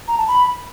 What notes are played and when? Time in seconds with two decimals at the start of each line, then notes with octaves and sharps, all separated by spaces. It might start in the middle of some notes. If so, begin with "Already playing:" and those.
0.08 A#5
0.18 A5
0.28 B5